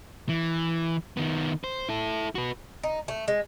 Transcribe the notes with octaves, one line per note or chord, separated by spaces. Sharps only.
E3
D#3 B3
C5
E4 A4
F#4 B4
D#4
A3
G#3